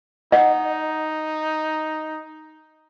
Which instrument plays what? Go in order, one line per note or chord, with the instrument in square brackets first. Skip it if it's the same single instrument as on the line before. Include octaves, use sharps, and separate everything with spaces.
[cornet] D#4 [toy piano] D#5 [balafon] F#5